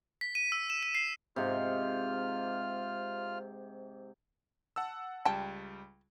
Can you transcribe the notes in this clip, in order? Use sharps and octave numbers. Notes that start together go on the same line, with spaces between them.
B6
D#7
E6
E7
D#7
C7
G#2 C3 F4 F6
F#5 A5 E6
C#2 G3 G5 A5